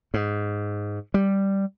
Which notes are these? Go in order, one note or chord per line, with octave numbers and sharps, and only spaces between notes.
G#2
G3